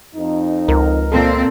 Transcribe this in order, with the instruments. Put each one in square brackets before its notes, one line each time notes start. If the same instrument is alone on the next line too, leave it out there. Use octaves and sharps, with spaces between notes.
[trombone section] F2 D#4
[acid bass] C#2 [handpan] A#4
[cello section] A#2 C4 [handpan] A4